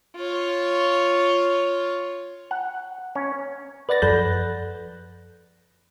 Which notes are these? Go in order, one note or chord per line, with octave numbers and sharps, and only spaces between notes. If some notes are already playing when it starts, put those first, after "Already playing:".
F4 C#5
F#5
C#4
B4 D5 F#5 A6 A#6
F#2 F3 A4 B5 F#6 G6